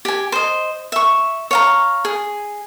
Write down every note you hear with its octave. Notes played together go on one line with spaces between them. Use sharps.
G4 G#5
C5 D#5
E5 C#6
C#5 F5 A#5
G#4